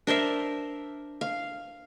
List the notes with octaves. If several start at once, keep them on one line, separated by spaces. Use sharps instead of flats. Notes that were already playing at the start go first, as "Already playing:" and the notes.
D4 A#4 C5 E5
F5